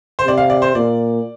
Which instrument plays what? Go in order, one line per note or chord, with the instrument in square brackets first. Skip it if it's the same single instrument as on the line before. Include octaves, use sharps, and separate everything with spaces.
[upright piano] C5
[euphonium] C3 [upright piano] D5
[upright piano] F5
D5
C5
[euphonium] A#2 [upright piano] D5